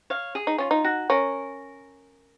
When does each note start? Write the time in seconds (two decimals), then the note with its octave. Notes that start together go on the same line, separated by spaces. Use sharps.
0.10 C#5 F5
0.35 G#4
0.47 D#4
0.58 C#4 F4
0.71 D#4
0.84 F#4
1.10 C#4 A#4